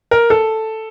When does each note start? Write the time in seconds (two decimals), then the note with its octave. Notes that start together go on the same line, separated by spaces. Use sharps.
0.11 A#4
0.30 A4